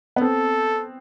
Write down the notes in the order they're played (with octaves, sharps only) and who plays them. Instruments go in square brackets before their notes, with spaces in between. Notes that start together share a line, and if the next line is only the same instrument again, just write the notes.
[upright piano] B3
[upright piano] C4 [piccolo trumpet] A4